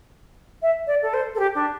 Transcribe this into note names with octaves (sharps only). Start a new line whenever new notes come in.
E5
D5
A4
C5
A4
G4
D4